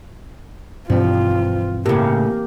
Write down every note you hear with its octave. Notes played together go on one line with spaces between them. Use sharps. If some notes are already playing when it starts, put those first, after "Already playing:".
G2 B2 E3 F3 G3 C4 F4
A2 C#3 A#3 G4 A#4